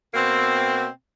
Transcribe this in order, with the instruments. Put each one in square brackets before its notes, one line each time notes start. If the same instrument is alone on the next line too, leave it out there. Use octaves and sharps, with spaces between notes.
[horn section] B2 A#3 C4